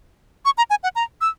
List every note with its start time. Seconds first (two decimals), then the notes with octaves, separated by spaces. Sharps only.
0.45 C#6
0.58 A#5
0.70 G#5
0.83 F#5
0.96 A#5
1.21 E6